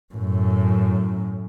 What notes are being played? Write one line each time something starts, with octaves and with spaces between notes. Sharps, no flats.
F#2 A2